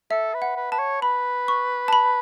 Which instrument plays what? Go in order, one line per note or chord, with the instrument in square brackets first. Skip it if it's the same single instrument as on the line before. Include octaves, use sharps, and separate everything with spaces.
[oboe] A4 [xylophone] E5
[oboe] B4
[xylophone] F#5
[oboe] B4
[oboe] B4 [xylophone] A5
[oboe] C#5
[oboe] B4 [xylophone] B5
[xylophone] C#6
A5
B5